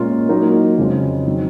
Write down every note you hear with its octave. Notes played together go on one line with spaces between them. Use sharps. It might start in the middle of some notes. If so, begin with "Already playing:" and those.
Already playing: A#2 G#3 C#4 F4 A#4
F#3 A#3 D#4 F#4 A#4
F2 C#3 G#3
D#3 F#3 C4